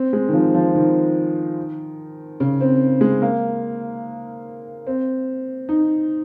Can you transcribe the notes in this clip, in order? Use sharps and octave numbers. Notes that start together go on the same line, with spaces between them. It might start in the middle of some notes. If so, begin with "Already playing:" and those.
Already playing: C4
G#3
D#3
F3
F3
D#3
C#3
C4
G#3
A#3
C4
D#4